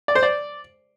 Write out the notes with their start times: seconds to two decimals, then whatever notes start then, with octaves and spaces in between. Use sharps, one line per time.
0.08 D5
0.15 C5
0.23 D5